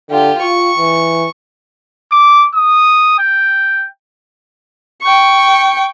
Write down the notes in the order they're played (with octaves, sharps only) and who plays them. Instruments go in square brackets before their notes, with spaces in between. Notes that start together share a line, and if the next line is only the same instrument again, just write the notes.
[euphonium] D3 [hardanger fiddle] F4 G4
[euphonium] F4 [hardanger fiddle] C#6
[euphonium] E3
[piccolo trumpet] D6
D#6
G5
[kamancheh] G5 C#6